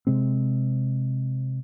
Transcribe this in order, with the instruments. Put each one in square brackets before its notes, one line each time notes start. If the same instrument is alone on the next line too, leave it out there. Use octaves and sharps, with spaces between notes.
[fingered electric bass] C3 G#3 C4